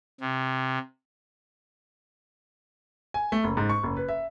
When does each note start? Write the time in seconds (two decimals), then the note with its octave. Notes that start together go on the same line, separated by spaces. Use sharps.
0.20 C3
3.14 G#5
3.32 A3
3.44 F#1
3.57 G#2
3.70 C#6
3.83 F#1
3.97 B4
4.09 E5